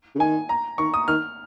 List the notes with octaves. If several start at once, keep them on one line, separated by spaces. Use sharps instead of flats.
C#3
D#3 G#5
A#5
D#3 C#6
D#6
D#3 F6